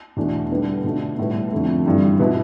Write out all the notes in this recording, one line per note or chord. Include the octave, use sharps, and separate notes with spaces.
E2 B2 A3 D4
D3 G3 B3 D4
B2 A3 D4
A2 G3 B3
F2 D3 A3
G2 E3 G3
B2 B3 E4